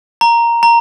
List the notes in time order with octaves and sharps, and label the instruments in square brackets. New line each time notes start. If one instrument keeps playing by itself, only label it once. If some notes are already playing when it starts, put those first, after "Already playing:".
[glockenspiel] A#5
A#5